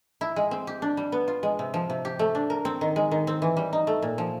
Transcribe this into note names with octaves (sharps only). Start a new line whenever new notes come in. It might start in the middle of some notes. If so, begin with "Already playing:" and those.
E4
G#3
C4
G4
D4
G3
B3
F4
G#3
C3
F3
C3
G4
A3
D4
A#4
C4
D#3
G#3
D#3
C4
E3
G3
D#4
A3
A#2
F3